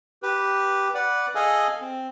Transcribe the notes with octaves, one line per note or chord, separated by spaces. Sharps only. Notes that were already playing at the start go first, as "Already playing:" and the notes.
G4 B4
B4 D5 F#5
G#4 A4 D#5 F5 G#5
C4